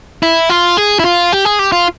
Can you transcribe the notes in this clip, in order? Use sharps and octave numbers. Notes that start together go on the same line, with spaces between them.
E4
F4
G#4
E4
F4
G4
G#4
G4
F4